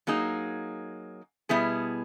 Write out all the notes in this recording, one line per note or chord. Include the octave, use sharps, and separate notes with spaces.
F#3 A#3 D#4 G#4
B2 G3 B3 E4 G#4